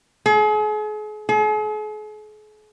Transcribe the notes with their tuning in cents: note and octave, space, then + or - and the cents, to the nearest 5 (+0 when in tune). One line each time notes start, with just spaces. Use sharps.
G#4 +40
G#4 +45